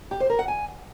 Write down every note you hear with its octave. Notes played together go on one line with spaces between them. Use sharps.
G4
C5
A#4
F#5
G#5